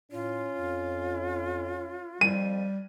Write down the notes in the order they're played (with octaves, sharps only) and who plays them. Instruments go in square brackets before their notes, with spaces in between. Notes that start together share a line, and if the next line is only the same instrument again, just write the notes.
[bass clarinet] A2 [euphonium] C#4 [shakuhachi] F4
[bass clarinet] F2
[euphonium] F2 [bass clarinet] G3 [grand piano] D#7